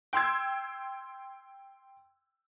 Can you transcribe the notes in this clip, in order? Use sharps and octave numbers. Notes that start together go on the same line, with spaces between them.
G5 C6 E6 G#6